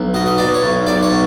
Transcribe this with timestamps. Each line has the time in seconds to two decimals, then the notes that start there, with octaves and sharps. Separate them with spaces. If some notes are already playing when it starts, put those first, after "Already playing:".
Already playing: B1
0.14 B2 D#5
0.26 D#5
0.38 B2 D5
0.54 C#5
0.63 B1
0.87 B1 D5
1.03 C#5
1.10 B2